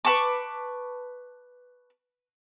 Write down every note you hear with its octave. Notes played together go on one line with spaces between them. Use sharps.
B4 A5 C#6 D6